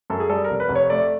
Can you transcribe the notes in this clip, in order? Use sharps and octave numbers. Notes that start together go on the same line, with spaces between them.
F#2 A4
G#4
G3 A4
A#4
F1
B4
F1
C#5
A3 D5